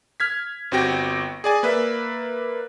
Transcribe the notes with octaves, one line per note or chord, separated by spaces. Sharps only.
F6 G#6 B6
G1 C4 F#4 G4 G5 A#6
G#4 D5 G#5
A#3 B4 D5 E5